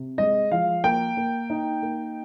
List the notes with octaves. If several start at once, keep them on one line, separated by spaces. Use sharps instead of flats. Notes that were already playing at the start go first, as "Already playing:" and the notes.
Already playing: C3
G#3 D#5
F3 F5
A#3 G5
A#3
D#4
A#3